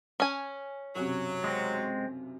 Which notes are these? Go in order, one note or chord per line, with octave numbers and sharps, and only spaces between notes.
C#4 G#5
B1 F#2 C3 F#3
G#3 C4